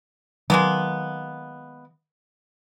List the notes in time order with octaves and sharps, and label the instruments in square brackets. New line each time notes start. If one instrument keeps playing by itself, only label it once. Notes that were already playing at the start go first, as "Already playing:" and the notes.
[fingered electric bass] D#3 F#3 [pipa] G#3 A#3 B3